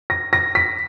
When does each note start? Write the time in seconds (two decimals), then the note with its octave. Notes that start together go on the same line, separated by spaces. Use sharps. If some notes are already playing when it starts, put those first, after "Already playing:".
0.10 A#6
0.33 A#6
0.55 B6